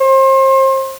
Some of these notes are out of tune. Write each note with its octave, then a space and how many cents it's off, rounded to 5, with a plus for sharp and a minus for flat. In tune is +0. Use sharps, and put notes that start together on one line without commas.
C5 +35